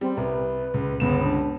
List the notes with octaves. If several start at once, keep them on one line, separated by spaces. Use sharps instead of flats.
G3 C4
C2 B4
C#2
G1 C#2 B3 E7
D4